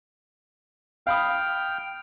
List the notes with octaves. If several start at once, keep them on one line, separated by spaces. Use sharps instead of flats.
F5 G5 B5 D#6 F6